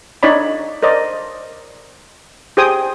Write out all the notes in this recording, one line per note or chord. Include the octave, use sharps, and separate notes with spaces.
D4 D#4 C#5 D5 B5
A#4 C5 D5 D#5
G4 G#4 C5 G5 G#5 D#6